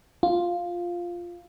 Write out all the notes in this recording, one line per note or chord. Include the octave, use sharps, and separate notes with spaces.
F4